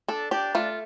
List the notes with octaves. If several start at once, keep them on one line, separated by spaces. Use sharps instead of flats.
D4 A4
D4 G4
A3 F4